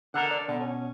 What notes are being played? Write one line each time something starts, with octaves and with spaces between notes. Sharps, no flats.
D3 A4 A#4 F#5
D5
B2 D3
C#4